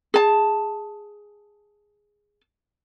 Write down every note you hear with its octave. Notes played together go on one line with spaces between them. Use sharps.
G#4 A5